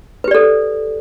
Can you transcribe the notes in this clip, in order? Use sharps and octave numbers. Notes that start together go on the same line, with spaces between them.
G4 A4 B4 D5